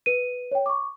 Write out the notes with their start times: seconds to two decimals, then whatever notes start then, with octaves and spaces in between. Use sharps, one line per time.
0.06 B4 D#7
0.51 C#5 G5
0.66 C#6 D6